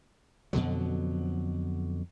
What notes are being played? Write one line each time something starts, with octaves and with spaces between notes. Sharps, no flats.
F2 B2 D3 F#3